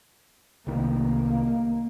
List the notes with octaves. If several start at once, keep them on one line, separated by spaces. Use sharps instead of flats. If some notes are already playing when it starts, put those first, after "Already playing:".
C2 D#3 A#3